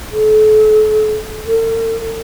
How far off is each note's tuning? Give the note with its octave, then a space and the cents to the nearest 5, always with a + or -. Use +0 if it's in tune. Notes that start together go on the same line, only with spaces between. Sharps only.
A4 -40
A4 +45